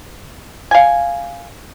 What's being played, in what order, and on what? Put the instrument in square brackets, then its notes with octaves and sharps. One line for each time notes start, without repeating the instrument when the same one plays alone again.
[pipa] F5 G#5